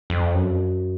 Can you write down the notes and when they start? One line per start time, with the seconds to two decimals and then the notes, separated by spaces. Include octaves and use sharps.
0.10 F2
0.34 F#2